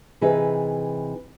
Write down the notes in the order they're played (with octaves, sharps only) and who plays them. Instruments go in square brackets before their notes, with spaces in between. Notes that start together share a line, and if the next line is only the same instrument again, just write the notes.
[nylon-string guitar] C3 E3 D#4 G#4 B4